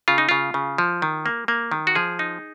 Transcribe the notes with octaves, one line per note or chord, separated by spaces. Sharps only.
C#3 F4
D#4
C#3 F4
C#3
F3
D#3
A#3
A#3
D#3
F#4
F3 G#4
D#4